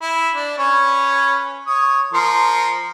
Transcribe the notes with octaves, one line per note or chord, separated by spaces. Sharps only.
E4
D4
C#4 B4 C#5
C#5 D#6
F3 A#4 C6